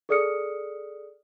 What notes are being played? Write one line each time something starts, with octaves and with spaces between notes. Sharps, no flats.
G#4 A4 D5 D#6 F6 C#7